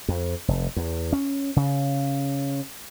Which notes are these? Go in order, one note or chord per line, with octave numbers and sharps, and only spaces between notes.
F2
F1
E2
C#4
C#3